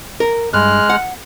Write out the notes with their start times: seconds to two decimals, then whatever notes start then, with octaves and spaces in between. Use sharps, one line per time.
0.20 A#4
0.53 G2 G#3 F6 F#6
0.90 F#5